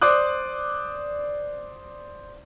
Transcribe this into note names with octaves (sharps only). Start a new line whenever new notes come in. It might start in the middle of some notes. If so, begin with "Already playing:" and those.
C5 D5 D6 D#6 F#6